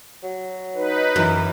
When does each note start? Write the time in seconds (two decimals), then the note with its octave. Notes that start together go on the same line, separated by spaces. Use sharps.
0.23 F#3
0.75 D#4 B4
1.16 F#2 E3